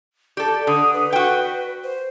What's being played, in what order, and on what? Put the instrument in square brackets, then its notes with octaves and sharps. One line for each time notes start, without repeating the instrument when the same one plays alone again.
[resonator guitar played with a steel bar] G4 A4 [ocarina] D5
[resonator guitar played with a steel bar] D3 [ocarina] D#6
[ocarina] B4
[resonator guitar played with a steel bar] F#4 G5
[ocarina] C5